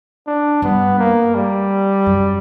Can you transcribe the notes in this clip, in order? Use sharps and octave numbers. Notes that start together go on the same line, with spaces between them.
D4
G2 B3
A#3
G3
F#2